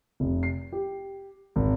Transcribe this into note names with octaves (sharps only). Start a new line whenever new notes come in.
F1
C7
G4
G#1